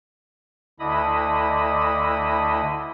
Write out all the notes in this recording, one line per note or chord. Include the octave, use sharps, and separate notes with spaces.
D2 D3 E4 D#5 B5 D#6